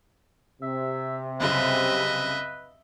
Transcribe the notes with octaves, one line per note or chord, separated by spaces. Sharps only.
C3 E5
C2 F#2 C#3 B4 D#5 E5